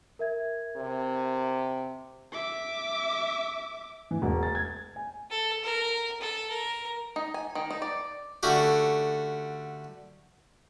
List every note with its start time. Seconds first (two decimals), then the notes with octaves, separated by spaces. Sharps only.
0.19 A#4 E5 G#6
0.76 C3
2.32 E5 D6
4.11 E3
4.22 E1
4.43 A6
4.55 G#6
4.96 G#5
5.30 A4
5.63 A#4
6.21 A4
6.50 A#4
7.16 D#4
7.34 G#5
7.55 D#3
7.71 D#4
7.82 D5
8.43 D3 A3 C#4 F#4 G4